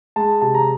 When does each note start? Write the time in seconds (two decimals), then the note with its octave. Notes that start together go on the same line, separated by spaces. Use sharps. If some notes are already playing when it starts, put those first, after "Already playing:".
0.16 G#3 A5
0.42 C3 A5
0.54 A#5